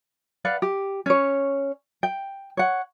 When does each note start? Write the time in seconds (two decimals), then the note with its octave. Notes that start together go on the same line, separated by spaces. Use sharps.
0.45 B4 D5 F5 F#5
0.62 G4
1.06 C#4 C#5
2.03 G5
2.57 C#5 F#5